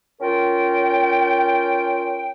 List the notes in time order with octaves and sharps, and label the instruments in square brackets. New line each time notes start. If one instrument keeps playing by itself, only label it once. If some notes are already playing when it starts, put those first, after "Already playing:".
[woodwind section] C#4 F4 A#4 G5